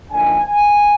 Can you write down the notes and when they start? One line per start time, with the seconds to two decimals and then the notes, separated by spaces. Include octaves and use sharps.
0.11 D3 F3 A#3 D#4 G#5